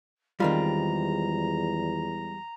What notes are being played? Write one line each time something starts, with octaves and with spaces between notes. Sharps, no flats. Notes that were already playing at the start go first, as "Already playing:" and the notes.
E2 D#3 G3 G#3 C4 F4 A#5